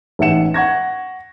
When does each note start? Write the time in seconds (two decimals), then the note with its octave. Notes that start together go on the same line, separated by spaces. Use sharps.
0.19 A1 G#2 E5 F#5 C#7 E7
0.54 F#5 C#6 G#6 A#6